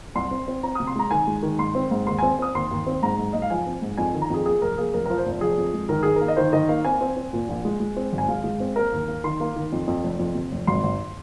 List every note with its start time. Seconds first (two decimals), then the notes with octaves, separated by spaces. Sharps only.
0.15 C2 C6
0.31 C4
0.48 C4
0.63 C4 A#5
0.75 C3 D#6
0.87 C6
0.95 G#3 A#5
1.11 D#3 G#5
1.27 G#3
1.43 D#3
1.59 G#2 C6
1.75 C4
1.91 G#2
2.07 D#2 C6
2.19 C4 G#5
2.39 C4 D#6
2.55 D#2 C6
2.71 D#2
2.87 C4
3.02 G#2 A#5
3.18 G#2
3.33 G#2 D#5
3.42 F5
3.50 F3 G#5
3.67 C4
3.82 G#2
3.98 F2 G#5
4.14 D#3
4.22 A#5
4.30 F2 G#4
4.45 A#3 G#4
4.62 F1 A#4
4.78 A#3 G#4
4.94 F1 A#4
5.06 F3 A#4
5.18 C5
5.25 F1
5.41 F3 G#4
5.57 F2
5.74 G#3
5.89 D#3 A#4
6.03 D#3 G#4
6.16 A#4
6.21 A#3
6.28 D#5
6.36 D#3 C5
6.53 D#3 D#5
6.69 A#3 F5
6.85 C4 G#5
7.01 C4
7.17 C4
7.33 A#2
7.49 A#1
7.65 G#3
7.80 G#3
7.97 C4
8.12 G#1
8.18 G#5
8.28 G#3 F5
8.44 G#3
8.60 C4
8.76 A#3 A#4
8.92 D#2
9.08 A#3
9.24 D#3 C6
9.40 A#3
9.56 D#3
9.72 F2
9.87 F2
10.04 F1
10.19 F2
10.35 C3
10.52 F1
10.67 G#1 C6
10.83 G#1